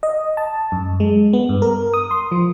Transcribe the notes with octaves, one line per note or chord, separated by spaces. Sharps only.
D#5
A5
F#2
G#3
B3
G2
A#4
D#6
C6
F3